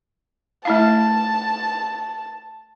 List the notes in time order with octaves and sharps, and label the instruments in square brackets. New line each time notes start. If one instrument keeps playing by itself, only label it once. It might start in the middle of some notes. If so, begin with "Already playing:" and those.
[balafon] A3 E4 F5 [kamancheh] A5